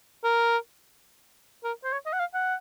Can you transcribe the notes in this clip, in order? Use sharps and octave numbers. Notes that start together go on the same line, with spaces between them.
A#4
A#4
C5
C#5
D#5
F#5
F5
F#5